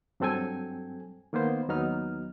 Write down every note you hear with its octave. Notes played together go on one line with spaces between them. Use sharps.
G2 F#3 C4 A4 G5 G#5
D#3 A#3 B3 C5
D#2 F#3 B3 D#4 F6